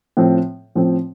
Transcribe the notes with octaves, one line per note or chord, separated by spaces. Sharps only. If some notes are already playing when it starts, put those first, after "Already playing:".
A2 F3 C4
A2 F3 C4